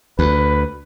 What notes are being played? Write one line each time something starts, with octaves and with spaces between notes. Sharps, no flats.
D2 B4